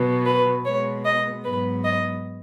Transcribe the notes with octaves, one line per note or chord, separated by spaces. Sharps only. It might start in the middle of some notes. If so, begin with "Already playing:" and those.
Already playing: B2 F#3 B3
B4
B2 G#3 B3 C#5
D#5
G#2 F#3 B3 B4
D#5